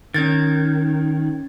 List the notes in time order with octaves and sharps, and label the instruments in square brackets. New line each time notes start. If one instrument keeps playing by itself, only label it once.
[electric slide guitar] D#3 [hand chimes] C#4 G#6 A6